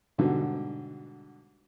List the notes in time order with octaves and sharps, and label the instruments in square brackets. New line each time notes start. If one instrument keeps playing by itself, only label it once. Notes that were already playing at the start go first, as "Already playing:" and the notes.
[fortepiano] G#2 B2 D3 G3